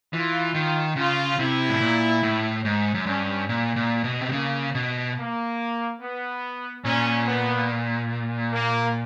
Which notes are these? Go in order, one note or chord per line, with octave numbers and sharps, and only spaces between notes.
E3 F4
D#3
C#3 F4
C3 E4
A2
A#2
A2
G#2
F#2
G2 C#4
A#2
A#2
B2
C3
C#3 A#3
B2
A#3
B3
A#2 C#4
B3
A#3